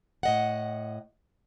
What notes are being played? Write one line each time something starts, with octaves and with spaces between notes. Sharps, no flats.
A2 D#5 F#5